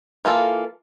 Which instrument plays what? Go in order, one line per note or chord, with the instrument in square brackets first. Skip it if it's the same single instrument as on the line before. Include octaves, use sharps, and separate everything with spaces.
[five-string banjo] E3 A#3 F4 A4